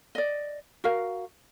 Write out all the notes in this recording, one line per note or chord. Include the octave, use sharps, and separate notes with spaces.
D5 D#5
F#4 A#4 F5